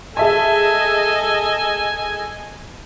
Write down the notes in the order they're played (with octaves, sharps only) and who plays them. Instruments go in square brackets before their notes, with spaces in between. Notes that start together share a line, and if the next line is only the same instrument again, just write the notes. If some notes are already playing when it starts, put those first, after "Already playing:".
[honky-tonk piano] G#4 E5 A5 [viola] A4 D#5 [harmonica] G#5